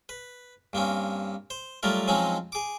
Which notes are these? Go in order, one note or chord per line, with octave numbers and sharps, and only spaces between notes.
B4
G2 A#3 C4 C#4
C5
F#3 G3 A3 F4 A#4
F3 F#3 G#3 C4 C#4 D#4
G#4 D6